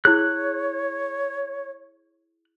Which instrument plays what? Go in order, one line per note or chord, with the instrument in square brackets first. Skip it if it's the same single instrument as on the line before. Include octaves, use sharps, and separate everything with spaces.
[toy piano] E4 G#4 [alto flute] C#5 [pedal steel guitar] F#6